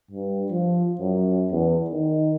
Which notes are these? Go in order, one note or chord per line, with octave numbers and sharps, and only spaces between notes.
G2
F3
F#2
E2
D#3